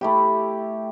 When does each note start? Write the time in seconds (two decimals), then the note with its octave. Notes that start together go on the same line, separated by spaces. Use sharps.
0.01 A3 E4 G4